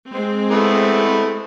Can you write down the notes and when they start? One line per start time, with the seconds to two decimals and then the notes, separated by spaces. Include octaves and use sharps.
0.12 G#3 C4
0.51 A3 B3 E4